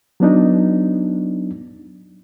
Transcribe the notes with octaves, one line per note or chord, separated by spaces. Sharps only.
F#3 B3 D4 D#4